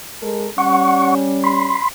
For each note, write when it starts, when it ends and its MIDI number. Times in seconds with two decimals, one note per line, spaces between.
0.23 0.48 56
0.23 0.48 69
0.23 0.48 70
0.58 1.80 55
0.58 1.80 61
0.58 1.15 78
0.58 1.15 85
1.44 1.89 83
1.44 1.89 84